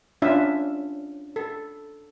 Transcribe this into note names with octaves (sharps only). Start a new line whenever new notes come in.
C#4 D4 F4 E5
A4